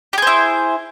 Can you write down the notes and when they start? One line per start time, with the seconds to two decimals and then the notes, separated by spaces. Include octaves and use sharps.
0.13 G4
0.18 G#4
0.22 C5
0.27 E4